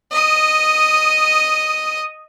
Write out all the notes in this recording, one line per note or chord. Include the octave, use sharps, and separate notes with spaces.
D#5 D#6